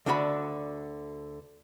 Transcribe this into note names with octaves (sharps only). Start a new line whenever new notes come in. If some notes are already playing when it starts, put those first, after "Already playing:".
D2 D3 D4 F#4 E5 B5